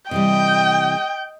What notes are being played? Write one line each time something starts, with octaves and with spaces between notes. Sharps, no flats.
C3 E3 G3 D#5 G5